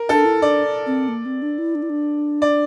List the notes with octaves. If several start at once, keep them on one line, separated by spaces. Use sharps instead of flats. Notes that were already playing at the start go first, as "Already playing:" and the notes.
Already playing: A#4
D4 A4
E4
D4 D5
C4
A#3
C4
D4
E4
D4
E4
D4
D5